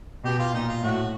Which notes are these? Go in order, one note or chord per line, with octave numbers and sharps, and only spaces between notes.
B2 G4
F4
A#2 D#4
F4
A2 F#4